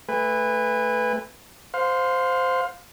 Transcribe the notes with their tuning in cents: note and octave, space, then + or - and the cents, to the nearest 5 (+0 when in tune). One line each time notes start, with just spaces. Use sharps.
A3 +0 B4 +5 G#5 -30
C5 -10 F5 +25